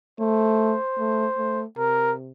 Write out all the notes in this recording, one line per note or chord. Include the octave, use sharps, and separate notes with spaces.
A3 C5
A3
A3
C3 A#4